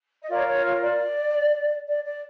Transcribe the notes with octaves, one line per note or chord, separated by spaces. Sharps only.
D#5
F4 A#4 C#5 D5
C#5
C#5
D5
D5
D5